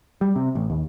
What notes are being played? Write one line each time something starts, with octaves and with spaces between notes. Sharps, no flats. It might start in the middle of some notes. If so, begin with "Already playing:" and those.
G3
C3
A1
D#2